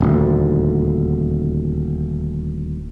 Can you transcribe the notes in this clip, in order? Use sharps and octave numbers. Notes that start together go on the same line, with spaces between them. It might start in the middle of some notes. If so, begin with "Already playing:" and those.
D#1 D2